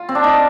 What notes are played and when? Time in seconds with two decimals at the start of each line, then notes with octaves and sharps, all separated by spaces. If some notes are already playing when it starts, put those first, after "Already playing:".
Already playing: F4
0.09 C4
0.15 D4
0.24 D#4